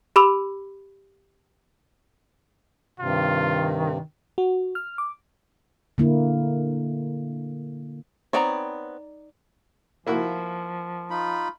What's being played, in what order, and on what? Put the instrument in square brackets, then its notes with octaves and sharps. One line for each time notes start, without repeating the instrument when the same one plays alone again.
[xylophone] G4 B5 D6 E6 F7
[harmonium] G2 C3 [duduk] D#3 [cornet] F4
[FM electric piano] F#4
F6
D6
[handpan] D3 A#3 E4
[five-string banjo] B3 C4 C#5 [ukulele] D#4 D5 A#5
[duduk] F3 [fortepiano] A#3 E4 F#4
[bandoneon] D#4 F4 B5